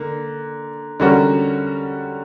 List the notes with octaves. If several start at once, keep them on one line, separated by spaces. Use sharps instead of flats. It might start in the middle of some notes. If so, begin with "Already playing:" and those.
Already playing: D3 A#3
D3 G3 C#4 F#4 A#4